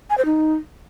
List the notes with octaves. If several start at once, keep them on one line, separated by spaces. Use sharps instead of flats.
G#5
C5
D#4